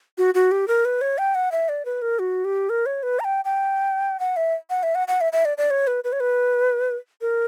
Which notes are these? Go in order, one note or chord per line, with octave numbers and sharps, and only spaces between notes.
F#4
F#4
G4
A#4
B4
C#5
G5
F#5
E5
D5
B4
A#4
F#4
G4
A#4
C#5
B4
A#5
G5
G5
F#5
E5
F#5
E5
F#5
F#5
E5
E5
D5
D5
C#5
B4
B4
C#5
B4
A#4